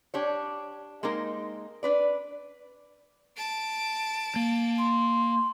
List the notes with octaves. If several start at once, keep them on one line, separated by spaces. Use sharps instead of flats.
D4 G4 C#5
G#3 A#3 C4 D#4 A#4
D4 B4 D5
A5 D7
A#3
C6